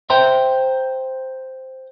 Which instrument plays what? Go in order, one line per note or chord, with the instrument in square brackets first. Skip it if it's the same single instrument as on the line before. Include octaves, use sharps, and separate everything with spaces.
[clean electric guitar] C5 E5 G5 A#5 C6